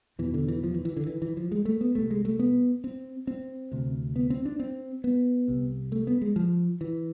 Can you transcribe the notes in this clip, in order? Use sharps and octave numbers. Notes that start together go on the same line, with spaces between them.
E2 B2 E3
D3
E3
F3
E3
E3
D3
E3
E3
F3
G#3
A3
B3
C2 C3 A3
G#3
A3
B3
C4
C4
D2 C3
B3
C4
D4
C4
B3
C2 C3
A3
B3
G#3
F3
E3